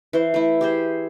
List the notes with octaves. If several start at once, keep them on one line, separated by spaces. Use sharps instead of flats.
E3 C5
A3 E4
G4 G#4 C5